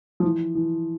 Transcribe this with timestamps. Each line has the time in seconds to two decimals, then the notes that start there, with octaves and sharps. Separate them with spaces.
0.20 F3
0.25 E3
0.55 E3